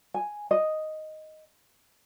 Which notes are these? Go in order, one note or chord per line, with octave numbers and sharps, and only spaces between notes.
G#5
D#5